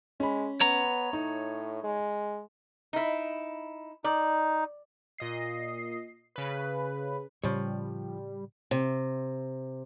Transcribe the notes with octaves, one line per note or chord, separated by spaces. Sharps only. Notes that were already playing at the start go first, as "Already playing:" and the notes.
G#3 C#4 B5
B3 C#5 A#5
A2 D#4
G#3
D#4 E4
D#4 D5
A#2 D#5 C7
C#3 B4
A2 C#3 F3 G3 C#4 C#5
C3